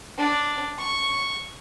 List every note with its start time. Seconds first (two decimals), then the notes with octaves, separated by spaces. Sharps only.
0.18 D4
0.79 C#6